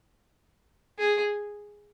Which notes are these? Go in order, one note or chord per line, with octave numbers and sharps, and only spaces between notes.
G#4